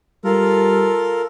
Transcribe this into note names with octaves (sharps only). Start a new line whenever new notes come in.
G3 F4 A4 A#4